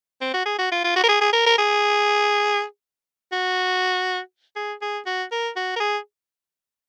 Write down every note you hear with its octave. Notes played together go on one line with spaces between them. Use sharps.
C4
F#4
G#4
F#4
F4
F4
F#4
A#4
G#4
G#4
A#4
A#4
G#4
F#4
G#4
G#4
F#4
A#4
F#4
A#4
G#4